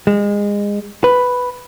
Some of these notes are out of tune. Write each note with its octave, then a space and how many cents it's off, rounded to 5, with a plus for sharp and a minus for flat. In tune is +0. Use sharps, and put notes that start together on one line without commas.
G#3 -25
B4 +5